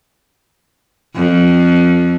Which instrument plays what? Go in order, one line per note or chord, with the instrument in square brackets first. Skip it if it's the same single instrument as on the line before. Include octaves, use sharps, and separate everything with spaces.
[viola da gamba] F2